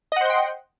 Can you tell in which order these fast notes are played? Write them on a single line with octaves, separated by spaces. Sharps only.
D#5 F#5 C5 C6 G5